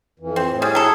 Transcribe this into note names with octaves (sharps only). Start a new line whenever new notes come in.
F2 E3
C4
A2
G3 G#4
F#3 A4